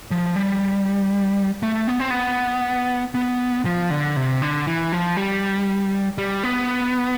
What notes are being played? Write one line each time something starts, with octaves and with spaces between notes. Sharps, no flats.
F3
G3
A3
B3
C4
B3
B3
F3
D3
C3
D3
E3
F3
G3
G3
B3